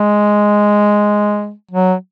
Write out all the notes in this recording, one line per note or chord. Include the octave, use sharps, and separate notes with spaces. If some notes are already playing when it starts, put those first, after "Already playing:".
Already playing: G#3
F#3